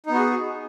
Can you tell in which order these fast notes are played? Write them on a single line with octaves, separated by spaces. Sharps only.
D#4 B3 F#4 G#4